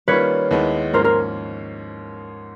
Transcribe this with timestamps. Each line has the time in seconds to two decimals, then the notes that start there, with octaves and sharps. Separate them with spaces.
0.08 D#3 G3 A#3 C#4 F4 B4 C#5
0.51 D#2 D#3 G#3 B3 E4
0.94 G#2 F3 A#3 C#4 A#4 C5
1.04 A#4 C5